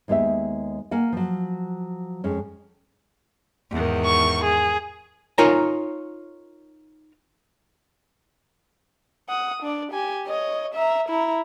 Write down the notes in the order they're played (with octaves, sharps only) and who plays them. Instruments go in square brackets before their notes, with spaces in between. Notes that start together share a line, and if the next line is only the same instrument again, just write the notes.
[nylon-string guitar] D#2 G#3 B3 G4 E5
A#3 F#5 G#5
F3 F#3
F2 G#3 C#4
[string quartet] E2 G#2 D#3
[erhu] C#6
G#4
[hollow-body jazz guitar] D#4 F4 A#4 C#5 G#5 A#5
[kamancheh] F#5 D#6
D4 D5
G4 G#5
C#5 D#5
E5 A#5
E4 A#5